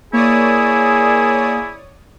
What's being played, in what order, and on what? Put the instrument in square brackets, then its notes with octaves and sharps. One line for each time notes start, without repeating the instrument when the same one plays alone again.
[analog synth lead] A#3 [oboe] E4 [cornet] G#4 [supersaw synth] C#5 D5 D#6